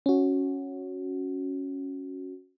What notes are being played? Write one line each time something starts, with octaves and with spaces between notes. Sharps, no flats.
C#4 F#4